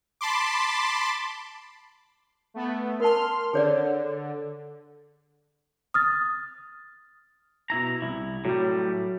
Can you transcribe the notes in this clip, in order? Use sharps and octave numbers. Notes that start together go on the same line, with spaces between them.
A5 B5 C6 D6
A3 B3
A#4 A5 C6 F6
D3 G#4 C#5 D5
D#6 F6 A6
B2 E4 A#5
C2 E4
A2 F#3 G3